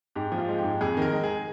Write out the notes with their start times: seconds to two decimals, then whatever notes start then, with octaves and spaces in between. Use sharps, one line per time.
0.15 G#2 G4
0.32 F3
0.38 F4
0.49 G#3
0.58 G4
0.64 G#2
0.81 F2 G#4
0.97 D#3 A#4
1.13 G#3
1.24 G#4